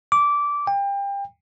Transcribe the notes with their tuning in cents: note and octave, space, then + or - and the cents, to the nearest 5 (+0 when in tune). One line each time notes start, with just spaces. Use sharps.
D6 -15
G5 +30